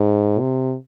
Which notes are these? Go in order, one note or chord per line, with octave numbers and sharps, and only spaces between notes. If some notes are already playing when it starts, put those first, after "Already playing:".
Already playing: G#2
C3